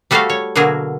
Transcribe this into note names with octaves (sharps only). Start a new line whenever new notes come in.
G3 A3 F#4 A4 C5 F5
C#5
B2 D3 F#3 A#3 G#4 A#4